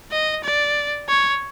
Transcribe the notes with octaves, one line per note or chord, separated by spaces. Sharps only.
D#5
D5
C#5